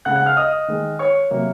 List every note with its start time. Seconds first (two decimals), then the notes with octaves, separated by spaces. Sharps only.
0.05 C#3 G#3 F#5 F#6
0.16 F#5 F#6
0.26 F5 F6
0.37 D#5 D#6
0.68 D#3 G#3
0.99 C#5 C#6
1.31 C3 F#3 A#3